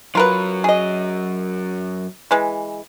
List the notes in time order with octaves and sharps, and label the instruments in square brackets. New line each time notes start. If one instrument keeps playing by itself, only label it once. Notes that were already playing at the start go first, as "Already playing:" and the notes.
[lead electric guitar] F#2 F#3 [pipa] F4 A#4 B4
[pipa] G#4 D#5
E3 G#3